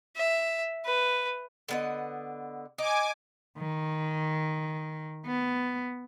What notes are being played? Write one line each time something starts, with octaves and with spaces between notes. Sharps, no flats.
E5
B4
D3 B3 D#5
D#4 G#5 D6
D#3
B3